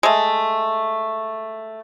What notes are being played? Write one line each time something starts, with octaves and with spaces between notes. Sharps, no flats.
G#3 A3